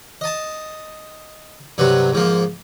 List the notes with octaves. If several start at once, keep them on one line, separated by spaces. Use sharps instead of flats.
D#5 A5
G2 C3 F#3 B4
G#2 F3 A#3